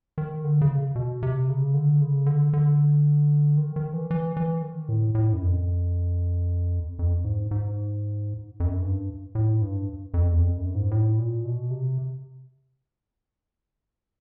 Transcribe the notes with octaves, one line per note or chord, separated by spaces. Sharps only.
D#3
D3
C#3
B2
C3
C#3
D3
C#3
D3
D3
D#3
D#3
E3
E3
E3
D#3
A2
A2
F#2
F2
F2
G#2
G#2
F2
F#2
G2
A2
G2
F2
E2
F2
F#2
G#2
A2
A#2
B2
C3